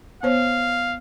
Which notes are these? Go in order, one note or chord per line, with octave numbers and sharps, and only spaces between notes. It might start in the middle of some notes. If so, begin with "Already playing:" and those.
B3 C5 C#5 F5